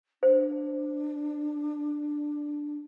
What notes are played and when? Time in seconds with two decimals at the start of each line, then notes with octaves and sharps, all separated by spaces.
0.23 D4 C5